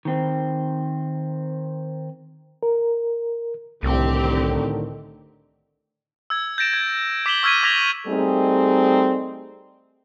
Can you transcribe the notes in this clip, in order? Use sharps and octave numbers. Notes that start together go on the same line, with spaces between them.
D#3 C4
A#4
C2 A2 D3 D#3 C4 G4
E6 G#6
G6 A6 A#6 D7 E7
G#6
D6 B6 D7 E7 F#7 G7
C#6 E6 F6 G#6 B6 D#7
D6 G#6 A#6 B6 F7 G7
G3 A3 C4 D#4 G#4